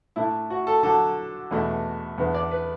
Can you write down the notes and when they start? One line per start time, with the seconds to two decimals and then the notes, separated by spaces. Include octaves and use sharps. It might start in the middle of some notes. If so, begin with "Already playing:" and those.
0.16 A2 A3 D4 E4
0.50 F#4
0.67 A4
0.83 D3 F#3 D4 A4
1.51 E2 B2 A3 D4
2.18 E2 D3 B3 D4
2.35 D5
2.51 B4